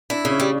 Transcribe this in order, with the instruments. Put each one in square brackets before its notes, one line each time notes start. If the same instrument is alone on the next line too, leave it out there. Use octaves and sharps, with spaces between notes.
[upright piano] D4 [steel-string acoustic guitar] E4
[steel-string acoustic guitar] C#3
[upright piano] C#4
[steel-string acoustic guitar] G3